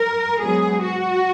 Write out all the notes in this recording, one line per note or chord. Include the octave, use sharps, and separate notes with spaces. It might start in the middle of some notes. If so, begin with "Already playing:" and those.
Already playing: A#4
G#2 F#3 B3 G#4
F#4